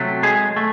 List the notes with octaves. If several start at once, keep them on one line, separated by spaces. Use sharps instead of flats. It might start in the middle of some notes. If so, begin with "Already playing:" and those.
Already playing: C3 F#3 A3
G#3 G#4
A3